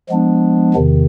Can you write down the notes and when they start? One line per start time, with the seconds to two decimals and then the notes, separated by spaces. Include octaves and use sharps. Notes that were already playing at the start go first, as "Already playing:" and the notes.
0.09 F3 G#3 B3 D4
0.74 E2 C3 D#3